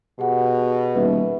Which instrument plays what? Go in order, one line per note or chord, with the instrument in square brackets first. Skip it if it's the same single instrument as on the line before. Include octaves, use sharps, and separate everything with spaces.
[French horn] B2 [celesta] G4 G#4 F#5
[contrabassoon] D#1 [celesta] B4 E5